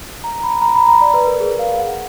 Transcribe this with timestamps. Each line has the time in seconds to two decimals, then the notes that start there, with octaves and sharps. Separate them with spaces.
0.24 A#5
0.43 B5
0.62 A#5
0.75 B5
0.88 A#5
1.01 D5
1.14 B4
1.27 A#4
1.40 G#4
1.59 F5
1.79 F#5